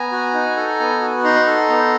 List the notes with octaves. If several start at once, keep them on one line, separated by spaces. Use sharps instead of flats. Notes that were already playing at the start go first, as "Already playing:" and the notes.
Already playing: B3 G#5 A#5
F#4
D#4
A4
B3
F#4
D#4 A#5 C6
A4
B3